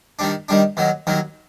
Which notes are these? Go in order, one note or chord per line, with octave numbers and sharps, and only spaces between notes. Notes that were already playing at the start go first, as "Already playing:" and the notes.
D#3 G3 D4
D#3 G3 D4
D#2 D#3 F#3
D#2 D#3 F#3